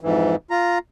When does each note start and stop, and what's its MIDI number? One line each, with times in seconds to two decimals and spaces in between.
0.01 0.35 41
0.01 0.35 44
0.01 0.35 52
0.51 0.78 65
0.51 0.78 82